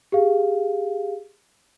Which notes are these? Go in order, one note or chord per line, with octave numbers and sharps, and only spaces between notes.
G4 G#4 F5